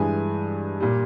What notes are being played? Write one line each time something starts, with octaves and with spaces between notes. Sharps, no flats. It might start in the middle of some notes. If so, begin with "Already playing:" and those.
Already playing: G2 E3 G#3 G#5
A#2 G3